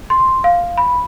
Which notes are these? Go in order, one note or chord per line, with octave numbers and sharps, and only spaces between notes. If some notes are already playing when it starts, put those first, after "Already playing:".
C6
F5
B5